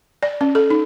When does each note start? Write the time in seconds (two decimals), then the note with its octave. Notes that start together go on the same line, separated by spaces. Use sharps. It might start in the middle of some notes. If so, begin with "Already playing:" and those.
0.23 D5
0.41 C#4
0.55 A4
0.70 D#4